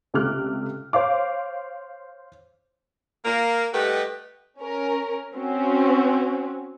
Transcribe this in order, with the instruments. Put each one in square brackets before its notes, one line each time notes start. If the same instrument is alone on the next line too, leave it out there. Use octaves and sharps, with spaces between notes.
[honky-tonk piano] C#2 C3 A3 D6 F6 F#6
C5 C#5 F5 D6
[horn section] A#3 A#4
G3 A3 G4 B4 D#5 F#5
[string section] C#4 A#4
C4 C#4 F#4